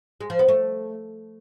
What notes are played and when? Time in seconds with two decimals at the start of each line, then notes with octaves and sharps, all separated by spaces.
0.21 G#3
0.30 F3
0.39 B3
0.48 A3